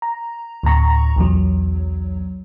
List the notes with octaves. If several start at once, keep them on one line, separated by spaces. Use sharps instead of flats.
A#5
D2 A2 A#5 C#6
B1 E2 F#3